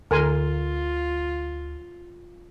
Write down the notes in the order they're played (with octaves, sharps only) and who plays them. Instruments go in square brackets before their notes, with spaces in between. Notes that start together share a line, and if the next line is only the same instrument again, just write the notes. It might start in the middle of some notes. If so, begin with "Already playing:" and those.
[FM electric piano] D2 [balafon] D3 [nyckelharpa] F4 [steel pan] A#4 G#5 C6